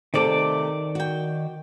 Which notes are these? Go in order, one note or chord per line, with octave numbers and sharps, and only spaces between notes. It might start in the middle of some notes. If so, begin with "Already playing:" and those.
C3 D#3 A3 A4 D5 D6
F#4 G5